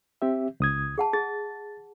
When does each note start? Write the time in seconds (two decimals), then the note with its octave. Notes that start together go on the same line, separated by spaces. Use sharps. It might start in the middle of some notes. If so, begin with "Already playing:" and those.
0.22 C4 G4 E5
0.60 C#2 D#6 G#6
0.98 G#4 F#5 A5
1.13 G#4 A6